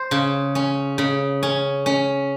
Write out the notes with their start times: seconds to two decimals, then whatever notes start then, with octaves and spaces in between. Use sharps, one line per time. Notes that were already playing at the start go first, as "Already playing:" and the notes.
Already playing: C5
0.11 C#3
0.55 C#4
0.98 C#3
1.43 C#4
1.86 C#4